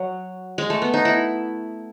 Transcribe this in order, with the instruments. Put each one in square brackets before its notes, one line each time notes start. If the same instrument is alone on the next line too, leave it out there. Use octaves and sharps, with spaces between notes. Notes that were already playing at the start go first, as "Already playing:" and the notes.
Already playing: [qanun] F#3
G#3
A3
B3
D#4
E4